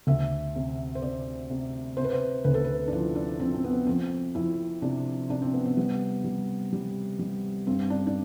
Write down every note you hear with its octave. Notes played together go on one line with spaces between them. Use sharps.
D2 E5
C3
C5
C3 D5
C3
C3 C5
B4
C5
D2 B4
A4
B4
D4
F3 E4
D4
F3 C4
C4
B3
F2 C4
F2 E4
C3 D4
C3 D4
C4
B3
C4
G3 B3
G3
G3
G3
G2 C4
D4
D4